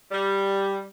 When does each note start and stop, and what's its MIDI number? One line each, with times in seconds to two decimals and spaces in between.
0.12 0.83 55